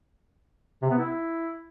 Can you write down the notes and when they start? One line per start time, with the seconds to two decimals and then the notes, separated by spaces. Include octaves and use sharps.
0.82 C3
0.90 B3
0.98 E4